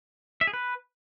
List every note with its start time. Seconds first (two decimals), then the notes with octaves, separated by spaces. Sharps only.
0.41 E5
0.47 G#4
0.53 B4